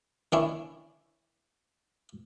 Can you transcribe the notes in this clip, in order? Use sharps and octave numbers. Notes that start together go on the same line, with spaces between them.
D#3 C#4 D4 E4